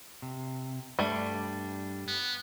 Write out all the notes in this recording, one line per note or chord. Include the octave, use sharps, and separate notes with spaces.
C3
G2 G3 A3 D4
B3